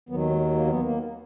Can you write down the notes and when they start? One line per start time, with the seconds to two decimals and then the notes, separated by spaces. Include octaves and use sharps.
0.09 D#2 D#3 F#3 B3
0.31 G#3
0.53 A#3
0.67 B3
0.80 A#3